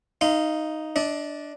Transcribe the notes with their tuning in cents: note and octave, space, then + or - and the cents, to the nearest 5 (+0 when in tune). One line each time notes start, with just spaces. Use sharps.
D#4 +0 F5 -20 C6 -40
D4 +0 D#5 +35